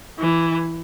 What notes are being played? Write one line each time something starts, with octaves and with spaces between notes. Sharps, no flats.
E3